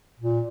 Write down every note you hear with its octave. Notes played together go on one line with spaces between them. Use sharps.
A#2